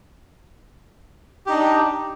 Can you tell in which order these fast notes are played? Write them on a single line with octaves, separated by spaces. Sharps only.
G4 D#4 D4